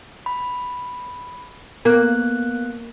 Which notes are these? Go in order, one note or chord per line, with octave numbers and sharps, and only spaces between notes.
B5
A#3 B3 F#6